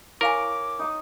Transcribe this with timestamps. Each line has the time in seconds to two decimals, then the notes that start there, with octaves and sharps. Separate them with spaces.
0.21 E4 A#4 C#5 F5 G#5 D6
0.79 D#4 D#6